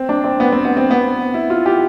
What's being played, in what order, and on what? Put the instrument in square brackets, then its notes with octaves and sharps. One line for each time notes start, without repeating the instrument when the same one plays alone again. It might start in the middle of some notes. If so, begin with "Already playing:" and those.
Already playing: [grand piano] C4
D4
C4
B3
C4
B3
C4
B3
E4
F4
G4